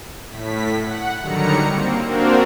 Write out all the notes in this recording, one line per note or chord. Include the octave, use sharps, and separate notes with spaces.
A2 B6
F#5
D3 D#3 F#3 G3 A#5 C#7
A#3 C4
A#3 C4 D4 F#4 A#4